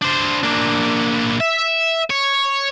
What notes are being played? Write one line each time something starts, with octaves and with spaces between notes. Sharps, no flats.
D4 C5
A#3 D4
E5
C#5